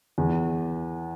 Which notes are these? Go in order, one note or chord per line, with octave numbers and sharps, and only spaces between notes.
E2